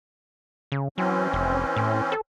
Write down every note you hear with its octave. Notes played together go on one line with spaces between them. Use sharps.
C#3
E3 F#3 C4 C#4
F1
A2
A4